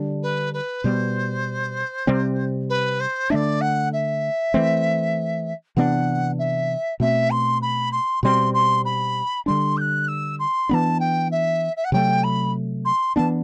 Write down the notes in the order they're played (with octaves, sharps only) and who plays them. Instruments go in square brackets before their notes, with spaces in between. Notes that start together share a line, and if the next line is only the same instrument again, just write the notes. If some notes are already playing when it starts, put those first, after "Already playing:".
Already playing: [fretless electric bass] D3 G3 D4
[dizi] B4
B4
[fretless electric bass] B2 G3 B3 [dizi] C5
[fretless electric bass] C3 G3 C4
[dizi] B4
C5
[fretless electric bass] D3 A3 D4 [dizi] D5 E5
[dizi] F#5
E5
[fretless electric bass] E3 A3 C4
[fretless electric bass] C3 E3 B3 D4 [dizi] F#5
[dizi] E5
[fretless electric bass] B2 A3 C4 [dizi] E5
[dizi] C6
B5
C6
[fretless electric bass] B2 G3 C4 [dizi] C6
[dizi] C6
B5
[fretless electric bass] D3 G3 D4 [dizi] C6
[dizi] G6
F#6
E6
C6
[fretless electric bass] E3 B3 D4 [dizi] A5 B5
[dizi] G5
E5
E5
F#5
[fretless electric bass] C3 F#3 A3 [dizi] G5
[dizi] B5
C6
[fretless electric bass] E3 B3 D4 [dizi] A5